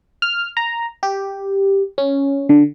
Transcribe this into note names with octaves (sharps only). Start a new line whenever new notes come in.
F6
A#5
G4
C#4
D3